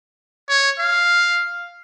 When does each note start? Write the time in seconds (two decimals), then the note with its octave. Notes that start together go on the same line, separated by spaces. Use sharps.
0.49 C#5
0.79 F5